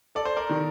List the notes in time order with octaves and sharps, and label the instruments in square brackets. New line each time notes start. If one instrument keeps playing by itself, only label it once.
[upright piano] A4 [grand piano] D5
[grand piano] C5
A#4 D5
[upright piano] D#3